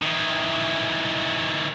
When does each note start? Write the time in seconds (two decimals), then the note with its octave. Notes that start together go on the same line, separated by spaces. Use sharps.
0.02 D#3 E3